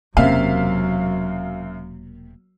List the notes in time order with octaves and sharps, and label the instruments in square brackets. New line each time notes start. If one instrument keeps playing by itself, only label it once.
[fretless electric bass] E1 C3 [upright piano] F#2 E5 F5 [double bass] F#3 [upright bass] A#3